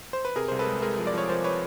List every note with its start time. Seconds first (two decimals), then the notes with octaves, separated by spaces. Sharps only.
0.13 C5
0.25 B4
0.36 C3 G#4 A#4
0.48 C2 C5
0.59 A4 B4
0.67 G#3
0.82 G#3 G#4 A#4
0.98 F3
1.07 D5
1.14 F3 C#5
1.29 F3 A#4 C5
1.44 B4 C#5